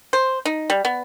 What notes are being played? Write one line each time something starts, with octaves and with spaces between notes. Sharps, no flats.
C5
D#4
G3
B3